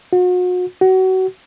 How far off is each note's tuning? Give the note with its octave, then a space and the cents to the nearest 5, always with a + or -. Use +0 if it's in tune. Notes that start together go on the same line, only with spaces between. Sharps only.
F#4 -40
F#4 +25